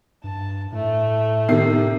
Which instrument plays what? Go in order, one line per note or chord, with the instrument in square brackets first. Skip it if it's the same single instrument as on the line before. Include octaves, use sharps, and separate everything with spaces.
[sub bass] G2 [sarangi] A5
[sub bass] A2 [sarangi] A3
[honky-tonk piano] C3 D#3 C7